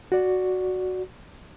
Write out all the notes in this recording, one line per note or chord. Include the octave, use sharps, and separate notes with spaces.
F#4 D5